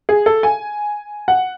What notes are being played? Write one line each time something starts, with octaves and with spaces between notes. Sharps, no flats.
G#4
A4
G#5
F#5